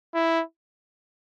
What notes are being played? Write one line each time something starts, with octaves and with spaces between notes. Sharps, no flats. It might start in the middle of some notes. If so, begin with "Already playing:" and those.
E4